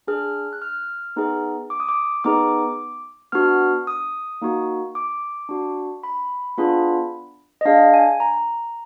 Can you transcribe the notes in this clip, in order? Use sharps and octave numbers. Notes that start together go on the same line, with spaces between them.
D4 G#4 F6
F#6
F6
B3 D#4 G#4
D6
D#6
D6
B3 D#4 G#4 D6
B3 D4 F#4 F6
D#6
A#3 D#4 F#4
D6
D4 F#4
B5
B3 D4 F4 G#4
D#5
D4 G#4 F5
G#5
A#5